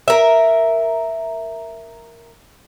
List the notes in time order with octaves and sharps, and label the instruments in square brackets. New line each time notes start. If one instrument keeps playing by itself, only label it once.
[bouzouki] A#4 E5